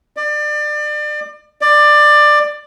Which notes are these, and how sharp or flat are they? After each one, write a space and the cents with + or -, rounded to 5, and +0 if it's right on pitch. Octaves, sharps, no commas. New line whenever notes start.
D5 +30
D5 +20